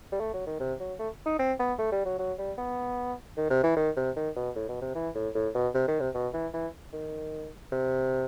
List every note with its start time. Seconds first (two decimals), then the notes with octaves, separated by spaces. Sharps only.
0.12 G3
0.20 A3
0.34 F#3
0.47 D#3
0.60 C3
0.80 F#3
0.99 A3
1.26 D#4
1.39 C4
1.59 B3
1.79 A3
1.92 G3
2.05 F#3
2.19 F#3
2.38 G3
2.58 B3
3.37 D#3
3.50 C3
3.63 E3
3.76 D#3
3.97 C3
4.16 D#3
4.36 B2
4.56 A2
4.68 B2
4.82 C3
4.95 E3
5.15 A2
5.35 A2
5.55 B2
5.75 C3
5.88 D#3
6.00 C3
6.14 B2
6.34 E3
6.54 E3
6.93 D#3
7.72 C3